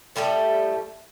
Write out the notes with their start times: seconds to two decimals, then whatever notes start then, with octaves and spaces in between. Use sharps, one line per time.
0.16 A2 G3 A3 G4